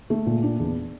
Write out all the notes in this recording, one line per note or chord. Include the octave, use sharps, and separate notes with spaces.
A3
A#2
D4
E2